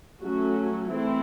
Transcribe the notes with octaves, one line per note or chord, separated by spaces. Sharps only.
F#3 A3 C#4 F#4
E3 A3 C4 E4